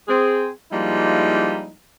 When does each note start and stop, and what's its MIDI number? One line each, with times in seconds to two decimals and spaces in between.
0.08 0.48 60
0.08 0.48 68
0.71 1.70 53
0.71 1.70 55
0.71 1.70 56
0.71 1.70 58
0.71 1.70 63
0.71 1.70 64